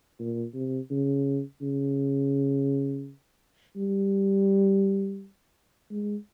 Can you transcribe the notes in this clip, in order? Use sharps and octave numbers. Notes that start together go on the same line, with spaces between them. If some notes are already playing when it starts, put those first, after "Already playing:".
A#2
C3
C#3
C#3
G3
G#3